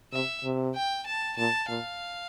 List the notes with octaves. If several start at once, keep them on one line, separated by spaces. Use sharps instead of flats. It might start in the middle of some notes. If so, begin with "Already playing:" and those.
C3 E5
C3
G5
A5
A#2 A5
A#2 F5